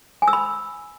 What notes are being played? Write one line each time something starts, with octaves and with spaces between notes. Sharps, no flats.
G#5
E6
B5